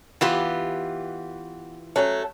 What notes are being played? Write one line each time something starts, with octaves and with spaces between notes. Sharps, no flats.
E3 B3 F4 G4
F#3 A3 C#4